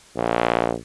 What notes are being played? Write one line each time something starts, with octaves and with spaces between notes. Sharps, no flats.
A#1